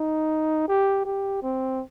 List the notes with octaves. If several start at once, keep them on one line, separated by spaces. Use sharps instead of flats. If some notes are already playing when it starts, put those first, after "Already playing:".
Already playing: D#4
G4
G4
C4